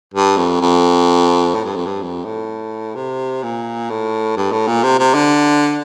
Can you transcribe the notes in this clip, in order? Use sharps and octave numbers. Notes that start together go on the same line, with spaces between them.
G2
F2
F2
A2
G2
F2
G2
F2
A2
C3
A#2
A2
G2
A2
A#2
C3
C3
D3